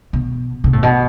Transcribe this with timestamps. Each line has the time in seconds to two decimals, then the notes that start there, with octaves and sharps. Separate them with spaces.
0.13 B2
0.64 B2
0.73 A2
0.83 B2